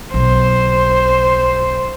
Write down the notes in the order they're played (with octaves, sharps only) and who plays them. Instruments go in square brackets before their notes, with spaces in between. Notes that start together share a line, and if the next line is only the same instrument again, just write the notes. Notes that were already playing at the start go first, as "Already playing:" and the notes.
[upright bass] B1 [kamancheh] C5